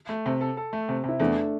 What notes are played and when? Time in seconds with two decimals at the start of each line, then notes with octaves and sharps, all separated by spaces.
0.09 A3
0.26 C3
0.41 A4
0.57 A4
0.73 A3
0.89 C3
1.04 C3 E4
1.20 E2 A3 D4